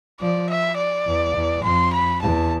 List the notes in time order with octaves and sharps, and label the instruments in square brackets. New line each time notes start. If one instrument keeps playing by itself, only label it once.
[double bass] F3 [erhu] D5
[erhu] E5
D5
[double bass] E2
E2
[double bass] F2 [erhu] C6
[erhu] B5
[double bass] E2 [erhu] A5